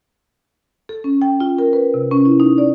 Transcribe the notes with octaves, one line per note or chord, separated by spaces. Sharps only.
A4
C#4
G5
F4
A#4
B4
C3
C#4
E4
D#4
D5